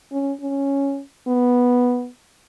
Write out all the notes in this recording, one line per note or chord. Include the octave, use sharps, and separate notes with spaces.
C#4
C#4
B3